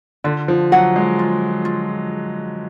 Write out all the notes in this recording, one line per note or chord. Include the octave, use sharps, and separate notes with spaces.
D3 F4
F3
F#3 F#5
G#3
F4
F4